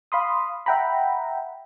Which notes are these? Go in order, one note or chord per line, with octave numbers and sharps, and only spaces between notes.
F5 B5 C6 D#6
E5 F#5 G5 A#5 B5